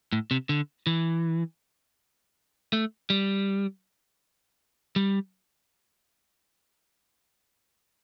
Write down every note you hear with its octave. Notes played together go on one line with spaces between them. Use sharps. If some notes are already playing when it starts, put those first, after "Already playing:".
A2
C3
D3
E3
A3
G3
G3